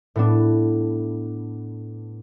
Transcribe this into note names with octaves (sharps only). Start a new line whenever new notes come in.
A2 B3 D4